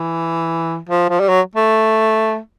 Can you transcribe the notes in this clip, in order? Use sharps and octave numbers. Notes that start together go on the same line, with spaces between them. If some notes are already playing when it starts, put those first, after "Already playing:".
Already playing: E3
F3
F3
G3
F#3
A3